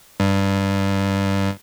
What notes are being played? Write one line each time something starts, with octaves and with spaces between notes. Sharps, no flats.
G2